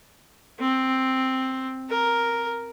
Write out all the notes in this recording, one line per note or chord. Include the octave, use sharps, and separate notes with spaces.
C4
A#4